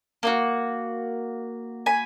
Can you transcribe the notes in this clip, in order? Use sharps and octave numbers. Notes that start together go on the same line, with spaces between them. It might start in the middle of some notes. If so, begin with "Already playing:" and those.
A#3 D#4 F#4
G#5 B5